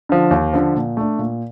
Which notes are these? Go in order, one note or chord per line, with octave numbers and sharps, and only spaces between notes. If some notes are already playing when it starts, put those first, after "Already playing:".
D3 F3
D#2
D3 F3
A#2
A3 D4
A#2